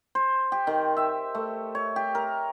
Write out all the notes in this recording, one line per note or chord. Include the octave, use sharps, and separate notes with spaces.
C5
G4
D#3
E5
A3
C#5
G4
A#4